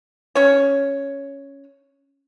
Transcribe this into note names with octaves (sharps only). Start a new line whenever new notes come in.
C#4 C#5